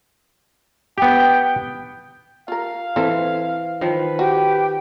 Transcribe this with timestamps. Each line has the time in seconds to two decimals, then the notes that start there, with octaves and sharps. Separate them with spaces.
0.98 B3 G4 G5
2.48 F4 A#4 F5
2.96 E3 C4 A4 C5
3.81 D#3 F3 B4
4.19 F#4 G4 G5